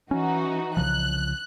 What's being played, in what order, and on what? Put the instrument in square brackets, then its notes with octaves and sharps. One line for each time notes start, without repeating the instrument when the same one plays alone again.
[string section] E3 D#4 F#4 [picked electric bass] C#4
[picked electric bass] C2 C#3 F3 [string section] F#6